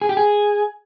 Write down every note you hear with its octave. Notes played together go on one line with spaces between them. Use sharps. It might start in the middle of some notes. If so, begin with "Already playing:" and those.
G#4
G4
G#4